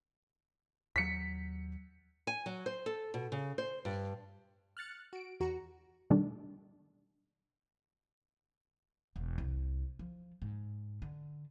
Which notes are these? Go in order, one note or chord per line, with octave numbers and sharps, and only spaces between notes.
D#2 F#3 B6 C#7
G#5
F#3
C5
A4
B2
C#3
C5
G2
F6 F#6 A6 C#7
F#4 D7
E2 F#4 A#5
B2 D#3 G3 A3 D4
E1
C2
F3
G#2
D3